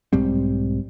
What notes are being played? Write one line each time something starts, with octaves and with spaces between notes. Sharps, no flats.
B1 G#2 G3 C4